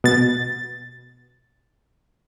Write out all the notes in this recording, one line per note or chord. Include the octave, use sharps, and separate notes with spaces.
B2 A6